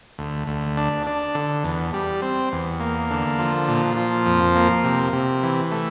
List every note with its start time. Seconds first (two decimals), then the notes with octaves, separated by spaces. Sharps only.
0.19 D2
0.47 D2
0.77 D4
1.07 D4
1.35 D3
1.64 E2
1.94 G3
2.22 C4
2.52 E2
2.80 A#3
3.10 D3
3.39 F3
3.69 A#2
3.97 F3
4.26 F2
4.56 A#3
4.84 C3
5.13 C3
5.43 E3
5.72 A3